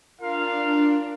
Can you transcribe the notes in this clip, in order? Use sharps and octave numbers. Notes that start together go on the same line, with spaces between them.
D4 F4 A#4 F5